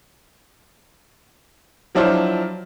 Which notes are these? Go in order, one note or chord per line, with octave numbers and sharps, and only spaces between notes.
F3 F#3 D4 E4 F4 C5